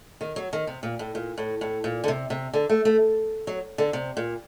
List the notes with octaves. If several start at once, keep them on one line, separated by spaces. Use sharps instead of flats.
D#3
F#3
D#3
C3
A#2
A2
A#2
A2
A2
A#2
D3
C3
C3
D3
A3
A3
F#3
D3
C3
A#2